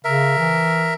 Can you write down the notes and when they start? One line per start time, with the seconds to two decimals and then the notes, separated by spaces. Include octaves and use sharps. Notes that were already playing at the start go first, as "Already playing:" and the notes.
0.05 C#3 A#4 E5
0.39 E3